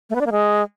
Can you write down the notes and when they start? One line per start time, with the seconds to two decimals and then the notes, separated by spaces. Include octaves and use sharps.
0.10 A3
0.15 B3
0.21 D4
0.26 A#3
0.32 G#3